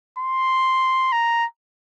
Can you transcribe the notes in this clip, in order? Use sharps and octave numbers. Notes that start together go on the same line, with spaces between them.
C6
A#5